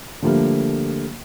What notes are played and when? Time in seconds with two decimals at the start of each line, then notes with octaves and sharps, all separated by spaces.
0.22 D3 F3 G3 A3 A#3